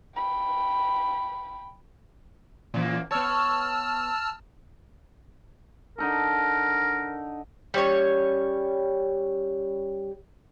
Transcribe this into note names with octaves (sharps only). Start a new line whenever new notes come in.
G5 B5
F#2 A#2 E3 A#3
B3 C#5 A5 E6 F6
D3 D#4 A4 A#4
G3 C#4 C#5